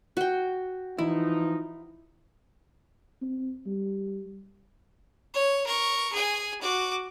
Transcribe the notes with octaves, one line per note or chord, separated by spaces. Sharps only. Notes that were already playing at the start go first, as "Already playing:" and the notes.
F#4 G5
E3 F3 D#4 E4
C4
G3
C#5
A#4 C#6
G#4 G#5
F#4 D6